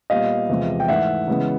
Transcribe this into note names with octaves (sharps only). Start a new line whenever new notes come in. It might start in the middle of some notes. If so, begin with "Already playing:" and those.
A#2 G3 B3 D#5 F5
E2 C3 F3 G#3
G5
G#2 E3 A3 E5 F#5
C#3 E3 G#3 B3